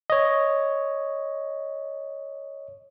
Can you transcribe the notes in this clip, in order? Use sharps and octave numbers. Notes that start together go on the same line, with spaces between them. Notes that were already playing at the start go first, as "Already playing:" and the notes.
C#5 D#5